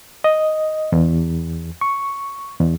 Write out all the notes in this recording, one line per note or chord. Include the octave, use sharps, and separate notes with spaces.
D#5
E2
C#6
E2